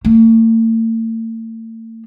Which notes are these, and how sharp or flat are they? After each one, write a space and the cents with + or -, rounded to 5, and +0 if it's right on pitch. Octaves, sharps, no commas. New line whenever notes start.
A3 +45